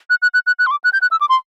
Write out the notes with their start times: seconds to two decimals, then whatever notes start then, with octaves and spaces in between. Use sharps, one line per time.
0.10 F#6
0.22 F#6
0.34 F#6
0.47 F#6
0.59 F#6
0.66 C6
0.71 D6
0.84 F#6
0.93 G6
1.02 F#6
1.11 E6
1.21 D6
1.29 C6